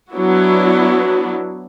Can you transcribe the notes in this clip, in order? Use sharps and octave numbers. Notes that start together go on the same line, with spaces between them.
F#3 B3 D4 E4 F#4